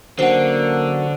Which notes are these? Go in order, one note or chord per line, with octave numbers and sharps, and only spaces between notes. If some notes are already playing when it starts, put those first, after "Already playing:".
D3 F#3 A#3 C#4 F#4 C5 F#5